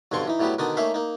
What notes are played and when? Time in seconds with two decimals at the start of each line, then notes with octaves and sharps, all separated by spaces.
0.11 B1 G2 D3 C4 C6 C#6
0.27 E3 D#4
0.39 A2 F#3 G3 B3 G4
0.59 B2 D3 D#3 D4 D#4 D#6
0.77 A3 A#3 C#4 D#4 E5 F5
0.94 A#3 D#4